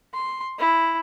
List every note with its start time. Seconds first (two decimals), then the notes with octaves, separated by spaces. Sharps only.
0.13 C6
0.59 E4